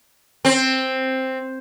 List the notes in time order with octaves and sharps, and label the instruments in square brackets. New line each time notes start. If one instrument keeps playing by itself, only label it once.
[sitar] C4